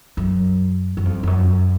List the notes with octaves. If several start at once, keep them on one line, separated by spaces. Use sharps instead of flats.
F#2
F#2
F2
F2
F#2